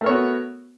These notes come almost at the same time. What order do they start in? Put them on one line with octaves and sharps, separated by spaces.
A3 A#4 C#5 B3 F#4